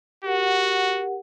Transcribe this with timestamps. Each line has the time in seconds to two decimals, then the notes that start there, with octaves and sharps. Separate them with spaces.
0.24 F#4 G4 A#4 F#5